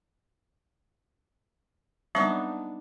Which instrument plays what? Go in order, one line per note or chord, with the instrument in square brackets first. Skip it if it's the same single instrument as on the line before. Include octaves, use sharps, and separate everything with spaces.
[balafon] F#3 G3 C4 [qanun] B3 D4 D#4